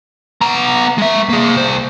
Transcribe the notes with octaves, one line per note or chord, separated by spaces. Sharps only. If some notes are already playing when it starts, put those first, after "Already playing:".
B3 A#5
G#3 E5
A#3 G#4
C2 C5